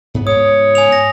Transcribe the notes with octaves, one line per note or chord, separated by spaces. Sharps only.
G#2 B3
C#5 D#6
G#5 D#6 F7
A#6